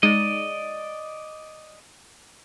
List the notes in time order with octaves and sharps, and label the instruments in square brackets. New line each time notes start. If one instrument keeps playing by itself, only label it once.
[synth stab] G#3 D#4 [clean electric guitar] D5 D#5